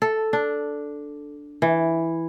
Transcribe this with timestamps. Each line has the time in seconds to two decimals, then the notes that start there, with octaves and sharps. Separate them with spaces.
0.02 A4
0.33 D4
1.62 E3